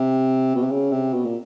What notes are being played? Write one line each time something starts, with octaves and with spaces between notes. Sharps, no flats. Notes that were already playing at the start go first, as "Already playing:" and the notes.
Already playing: C3
B2
C3
C#3
C3
B2
A#2